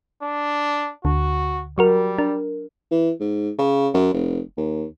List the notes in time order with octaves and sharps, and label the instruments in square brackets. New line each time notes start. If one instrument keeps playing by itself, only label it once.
[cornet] D4
[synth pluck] D2 D3 [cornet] F#4
[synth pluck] F#3 F#4 A#4 [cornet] G3
[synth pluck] D4 A#4
[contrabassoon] E3
G#2
C#3
F#2
F1
D#2